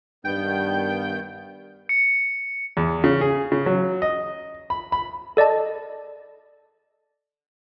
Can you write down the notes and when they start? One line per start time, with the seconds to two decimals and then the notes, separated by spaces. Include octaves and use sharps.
0.25 G2 D#3 B3 G5 G6
1.89 C#7
2.77 E2
3.04 C#3
3.21 G#4
3.52 C#3
3.66 F#3
4.02 D#5
4.70 B5
4.92 B5
5.37 A4 D5 D#5 A5